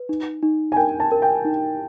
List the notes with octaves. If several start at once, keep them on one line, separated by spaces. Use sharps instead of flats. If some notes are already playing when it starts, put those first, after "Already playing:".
Already playing: B4
D#4
D#4
G#5
A#4 G5
A5
A#4
G5
D#4